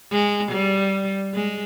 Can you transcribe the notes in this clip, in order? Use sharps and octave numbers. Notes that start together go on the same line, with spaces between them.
G#3
G3
G#3